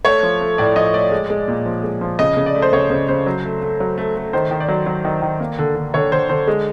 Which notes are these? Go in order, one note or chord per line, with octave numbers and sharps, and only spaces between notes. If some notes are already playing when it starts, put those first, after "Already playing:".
A3 C#5
F3
A3
A2 D5
F3 D#5
A3 D5
G#3
G#3
A#2
F3
G#3
F3
C#3 D#5
C#3
D5
A3
C5
C#3 C#5
C#3 C5
C#3 C5
F#3
A3
A3
F#3
A3
A3
D#3 C5
D#3
D5
F#3
F#3
D#3
D#3
A#3
D3
D3
D3 C#5
D3 C5
D3 C5
G#3